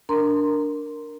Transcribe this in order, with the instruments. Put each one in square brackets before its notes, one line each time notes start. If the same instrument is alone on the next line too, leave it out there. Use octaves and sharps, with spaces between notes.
[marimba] D4 A#4 A#5 C6